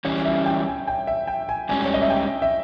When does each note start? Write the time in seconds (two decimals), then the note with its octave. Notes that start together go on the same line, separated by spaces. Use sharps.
0.05 E3 G3 C#4 C#5
0.26 E5
0.46 G5
0.67 G#5
0.88 G5
1.07 E5
1.27 G5
1.49 G#5
1.69 G#2 G3 C#4 G#5
1.86 C#5
1.94 D#5
2.02 E5
2.10 G5
2.42 E5